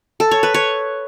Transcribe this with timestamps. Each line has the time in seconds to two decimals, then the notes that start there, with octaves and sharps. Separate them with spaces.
0.20 A4
0.31 C#5
0.43 B4
0.54 C#5